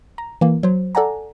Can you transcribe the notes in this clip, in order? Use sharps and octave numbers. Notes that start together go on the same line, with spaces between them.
A#5
E3 A#3
F#3 C5
A4 D5 F#5 G#5 A#5